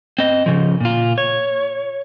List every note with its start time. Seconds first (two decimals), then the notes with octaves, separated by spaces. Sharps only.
0.18 C4 D#5
0.46 C#3 F3
0.80 A#2 F4
1.18 C#5